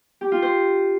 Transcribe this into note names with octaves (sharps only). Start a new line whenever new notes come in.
G4
F4
C5